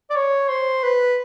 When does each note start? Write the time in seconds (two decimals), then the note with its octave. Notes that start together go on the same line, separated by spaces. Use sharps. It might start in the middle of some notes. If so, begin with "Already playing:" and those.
0.10 D5
0.15 C#5
0.49 C5
0.83 B4